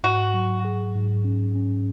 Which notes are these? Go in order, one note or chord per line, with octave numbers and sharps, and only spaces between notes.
G#2 F#4
F#3
G#4
G#2
C#4
C#4